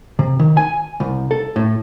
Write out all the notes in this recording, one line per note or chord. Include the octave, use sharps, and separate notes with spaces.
C3
D#3
G#5
C2
A4
A2